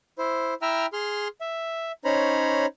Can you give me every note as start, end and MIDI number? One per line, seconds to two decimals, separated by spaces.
0.18 0.54 64
0.18 0.54 72
0.62 0.86 64
0.62 0.86 76
0.62 0.86 79
0.62 0.86 82
0.62 0.86 88
0.62 0.86 89
0.93 1.28 68
0.93 1.28 84
0.93 1.28 89
1.41 1.92 76
2.05 2.66 61
2.05 2.66 63
2.05 2.66 72
2.05 2.66 73
2.05 2.66 82
2.05 2.66 83